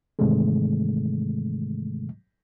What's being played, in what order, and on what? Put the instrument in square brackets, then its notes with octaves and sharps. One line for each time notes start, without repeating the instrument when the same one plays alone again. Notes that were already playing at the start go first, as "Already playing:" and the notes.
[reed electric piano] G#2 C3 D#3 E3 G#3 A3